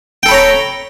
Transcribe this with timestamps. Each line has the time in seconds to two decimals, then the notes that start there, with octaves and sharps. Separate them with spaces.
0.23 G5
0.26 A4
0.28 B5
0.31 C#5
0.34 A#5